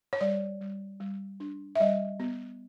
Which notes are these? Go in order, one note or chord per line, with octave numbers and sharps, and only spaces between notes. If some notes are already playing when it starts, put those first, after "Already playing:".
C#5
G3 D5
G3
G3
D4
E5
G3 D#5
B3